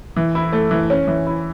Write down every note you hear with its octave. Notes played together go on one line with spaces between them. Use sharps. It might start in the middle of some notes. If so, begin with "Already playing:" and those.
E3
E4
A3
E3
C#4
E3
E4